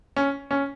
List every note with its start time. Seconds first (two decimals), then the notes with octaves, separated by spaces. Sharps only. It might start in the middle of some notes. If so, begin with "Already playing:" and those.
0.16 C#4
0.51 C#4